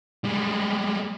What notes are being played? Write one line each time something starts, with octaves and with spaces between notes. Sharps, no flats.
G3 G#3